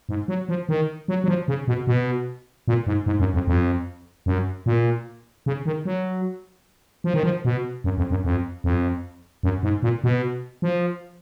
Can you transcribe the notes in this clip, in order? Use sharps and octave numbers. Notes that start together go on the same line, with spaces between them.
G#2
F#3
F3
D#3
F#3
F#3
F3
C#3
B2
B2
A#2
G#2
G#2
F#2
F2
F2
F#2
A#2
C#3
D#3
F#3
F3
D#3
F3
B2
F#2
F2
F#2
F2
F2
F#2
G#2
A#2
B2
F3